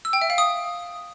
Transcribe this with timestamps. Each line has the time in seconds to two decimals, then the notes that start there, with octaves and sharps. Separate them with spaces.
0.05 E6
0.13 G5
0.21 E5
0.30 F5
0.38 D#6